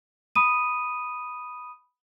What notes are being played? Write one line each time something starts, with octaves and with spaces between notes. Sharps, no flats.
B5 D#6 D#7